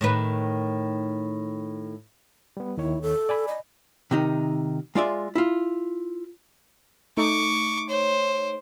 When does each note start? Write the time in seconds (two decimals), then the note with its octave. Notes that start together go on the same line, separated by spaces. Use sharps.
0.01 A2 D#3 B4
2.57 G3 B3
2.77 D#2 D#3 E4 C#5
3.02 A4
3.29 D5 G#5 B5
3.48 D#5
4.11 C3 D#3 D#4
4.95 G#3 F4 D5 E5
5.35 E4 F4
7.17 A3 D#4 C#6 D6 D7
7.89 C5 C#5